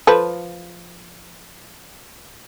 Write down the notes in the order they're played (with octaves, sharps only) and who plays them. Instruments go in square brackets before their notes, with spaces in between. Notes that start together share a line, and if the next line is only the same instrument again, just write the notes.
[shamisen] F3 A4 B4